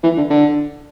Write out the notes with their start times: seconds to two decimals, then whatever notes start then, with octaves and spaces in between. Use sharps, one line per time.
0.03 E3
0.17 D3
0.30 D3